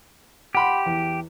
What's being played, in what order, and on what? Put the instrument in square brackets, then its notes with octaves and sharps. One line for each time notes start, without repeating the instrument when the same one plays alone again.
[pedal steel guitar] G4 [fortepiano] F#5 B5 C6
[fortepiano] E2